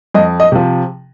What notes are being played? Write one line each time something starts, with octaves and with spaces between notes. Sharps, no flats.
F2 D#5
D#5
C3 F3